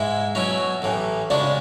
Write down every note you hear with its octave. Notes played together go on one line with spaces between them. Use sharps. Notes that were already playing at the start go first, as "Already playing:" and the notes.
Already playing: G#2 G#3 E4 E5
B2 F#3 C#4 E4
A1 A2 E3
C#3 G#3 D4 F#4 D5